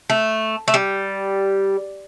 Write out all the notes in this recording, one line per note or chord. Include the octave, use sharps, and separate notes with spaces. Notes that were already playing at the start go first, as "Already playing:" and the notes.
A3
A3
G3